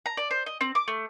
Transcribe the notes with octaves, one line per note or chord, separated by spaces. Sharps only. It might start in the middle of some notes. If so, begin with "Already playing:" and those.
A#5
D5
C5
D#5
C4
D6
A3